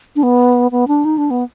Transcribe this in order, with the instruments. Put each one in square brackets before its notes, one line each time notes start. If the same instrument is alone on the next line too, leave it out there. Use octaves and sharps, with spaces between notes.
[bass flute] D4
B3
B3
D4
D#4
D4
B3